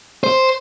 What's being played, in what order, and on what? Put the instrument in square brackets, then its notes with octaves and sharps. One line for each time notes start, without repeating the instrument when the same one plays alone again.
[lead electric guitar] C5